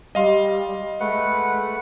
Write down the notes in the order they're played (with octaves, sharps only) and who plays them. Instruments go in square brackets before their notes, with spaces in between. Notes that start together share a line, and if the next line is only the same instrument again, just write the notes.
[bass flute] G3 [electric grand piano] D#5 F5 C6
[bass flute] G#3 [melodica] A3 B4 F#5